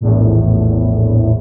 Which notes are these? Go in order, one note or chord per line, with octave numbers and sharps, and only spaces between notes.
A#1 E2 A2